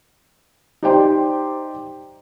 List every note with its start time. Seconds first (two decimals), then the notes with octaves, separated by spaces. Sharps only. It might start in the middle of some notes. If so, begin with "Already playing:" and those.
0.83 D#4 G4 C5 D5 G5 C6